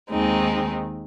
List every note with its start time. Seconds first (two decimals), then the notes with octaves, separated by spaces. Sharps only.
0.10 D#2 D#3 G#3 C4 D#4